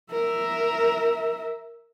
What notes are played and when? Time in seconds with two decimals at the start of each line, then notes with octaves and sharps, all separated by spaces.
0.11 A#4 E5